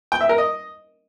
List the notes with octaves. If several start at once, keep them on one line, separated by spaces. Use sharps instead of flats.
G5
E5
A#4
D#5